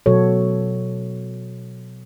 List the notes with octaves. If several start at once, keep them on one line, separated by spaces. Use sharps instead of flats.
B2 F#3 F#4 A4 C#5